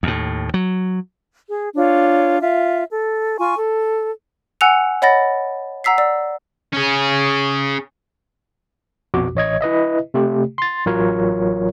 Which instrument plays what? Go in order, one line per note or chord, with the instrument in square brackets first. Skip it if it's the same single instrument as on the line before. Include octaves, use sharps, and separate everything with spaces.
[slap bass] D#2 A2
F#3
[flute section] G#4
D4 F4 C#5
F4 E5
A4
F4 G#5 C#6
A4
[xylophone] F#5 G#5 E6 F#6 C#7 F7
C#5 D#5 F#5 B5 A6 A#6
F#5 A#5 E6 B6 C7
D5 E6
[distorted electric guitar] C#4 G#4
[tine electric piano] A#1 F2 B2 F#4 D6
A1 C#5 D#5 G#6
E4 B4 D#5 E5
C3 A3 G4
C6 A6
A1 F#3 F4 A#4 C#5